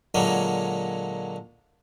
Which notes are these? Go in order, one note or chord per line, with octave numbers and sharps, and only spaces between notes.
A#2 D3 F#3 G#3 A#3